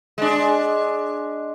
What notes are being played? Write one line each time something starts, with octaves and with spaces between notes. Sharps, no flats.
G#3 D4